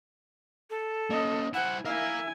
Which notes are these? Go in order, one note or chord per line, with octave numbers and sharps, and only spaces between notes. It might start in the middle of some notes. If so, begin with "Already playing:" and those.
A4
A#3 C#4 D#5
E4 C5 F#5 G#5
E4 A#4 E5 F5 G#5